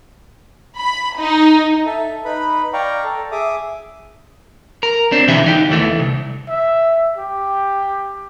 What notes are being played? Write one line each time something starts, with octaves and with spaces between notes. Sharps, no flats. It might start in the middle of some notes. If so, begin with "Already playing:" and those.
B5
D#4
A4 E5
D#4 B4 B5
D5 F5 G5 A#5 C#6
A4
G#4 E5 D6 D#6
A#4
C4 D4
B1 B2 D3 E3 G4 E5
D#4 G4
D#2 E3 A3
C2
E5
G4